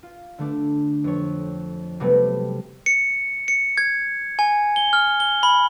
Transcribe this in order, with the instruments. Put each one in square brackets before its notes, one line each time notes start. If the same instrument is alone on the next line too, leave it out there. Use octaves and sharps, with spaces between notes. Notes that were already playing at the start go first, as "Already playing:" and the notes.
[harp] F4
D3 A3 D4
F2 C#5
C3 F#3 G3 A3 B3
[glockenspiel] C#7
C#7
G#6
G#5
G7
F6
G7
B5